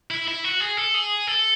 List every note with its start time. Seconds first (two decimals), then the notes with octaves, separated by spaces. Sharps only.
0.11 E4
0.28 E4
0.44 F#4
0.60 G#4
0.77 A4
0.94 G#4
1.27 A4